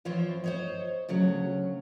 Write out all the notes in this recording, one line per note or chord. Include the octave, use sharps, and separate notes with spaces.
E3 F3 C4 F4 C#5
C5 C#5 D#5
D2 C#3 F#3 C#5